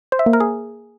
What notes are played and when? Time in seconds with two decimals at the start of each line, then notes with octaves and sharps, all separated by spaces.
0.12 C5
0.19 E5
0.26 A#3
0.33 A#4
0.40 G#4